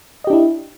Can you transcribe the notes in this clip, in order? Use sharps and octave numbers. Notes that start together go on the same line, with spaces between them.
D4 E4 G4 D#5